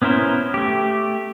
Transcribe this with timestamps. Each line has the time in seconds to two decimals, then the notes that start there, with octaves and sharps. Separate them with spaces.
0.02 B3 C#4 E4 A#4 C5
0.54 A3 G4